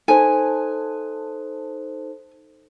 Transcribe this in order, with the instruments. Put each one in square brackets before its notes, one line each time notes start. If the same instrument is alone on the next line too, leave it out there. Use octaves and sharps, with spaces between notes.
[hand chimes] D#4 A4 C5 [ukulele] G#5